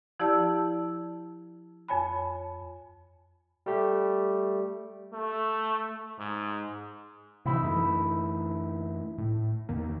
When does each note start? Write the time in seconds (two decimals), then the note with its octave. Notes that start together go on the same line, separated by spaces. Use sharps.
0.19 F3 E4 G4 D5 A5 E6
1.88 F2 C#5 G#5 B5
3.66 G3 A3 G4
5.13 A3
6.19 G#2
7.46 C3 E3 D#4 E4
7.62 F#2 E3 A3
9.18 A2
9.69 E2 D#3 A#3